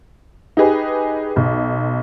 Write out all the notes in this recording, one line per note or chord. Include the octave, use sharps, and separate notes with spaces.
D#4 G4 G#4 B4
B1